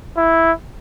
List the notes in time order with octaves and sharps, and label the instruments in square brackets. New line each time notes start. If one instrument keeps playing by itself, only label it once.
[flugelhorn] E4